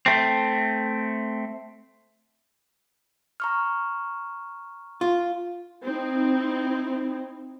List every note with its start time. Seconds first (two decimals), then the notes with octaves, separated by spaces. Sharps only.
0.06 A3 C4
3.40 A#5 C#6 F6
5.01 F4
5.82 C4 D#4 E4